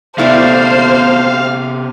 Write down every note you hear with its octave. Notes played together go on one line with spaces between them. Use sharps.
C3 A3 B3 E4 G4 C5 D5 F5